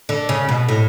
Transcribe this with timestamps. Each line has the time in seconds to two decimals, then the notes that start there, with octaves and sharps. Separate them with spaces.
0.09 D3
0.29 C#3
0.49 B2
0.69 A2